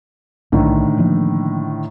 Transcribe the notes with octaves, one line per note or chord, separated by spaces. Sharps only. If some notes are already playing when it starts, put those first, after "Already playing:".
B1 A2 D3 D#3 G3 D4
E3 F3 A#3